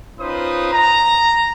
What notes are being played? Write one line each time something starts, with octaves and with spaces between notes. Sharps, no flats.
C#4 D#4 F4 B4 C5 D#6
A#5